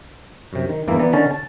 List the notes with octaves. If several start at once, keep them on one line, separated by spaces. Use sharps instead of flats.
F#2 C3
D#3
G1 E2 E3 A#3 E5
E3 B3 D5 A#5
D3 D#3 C#4 A5
A5